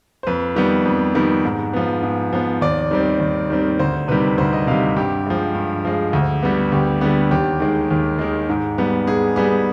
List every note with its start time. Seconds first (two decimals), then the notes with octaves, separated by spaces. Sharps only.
0.23 C5
0.27 F2 B4
0.56 D#3 G3 B3
0.85 F2
1.15 D#3 G3 B3
1.45 G#2
1.73 F3 B3
2.03 G#2
2.33 F3 B3
2.61 D#2 D5
2.91 D#3 G3 C4
3.20 D#2
3.50 D#3 G3 C4
3.79 D2 C5
4.08 C3 D#3 G3 B4
4.38 D2 C5
4.53 D#5
4.67 C3 D#3 G3 F5
4.96 G2 G4
5.26 F3 G#3
5.55 G2
5.85 F3 G#3
6.13 D2
6.43 D3 G3 B3
6.72 D2 G4
7.01 D3 G3 B3
7.31 D#2 G4
7.60 D#3 G#3
7.91 D#2
8.19 D#3 G#3
8.49 G#2
8.78 G3 B3
9.07 G#2 G#4
9.36 G3 B3 G#4